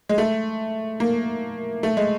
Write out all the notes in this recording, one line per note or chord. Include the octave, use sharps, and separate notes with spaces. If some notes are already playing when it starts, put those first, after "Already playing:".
G#3
A3
A#3
A3
G#3